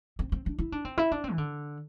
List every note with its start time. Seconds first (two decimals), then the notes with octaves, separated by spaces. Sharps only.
0.19 C4
0.32 C4
0.46 D4
0.58 E4
0.72 D4
0.85 C4
0.98 E4
1.12 D4
1.24 C4
1.32 E3
1.38 D3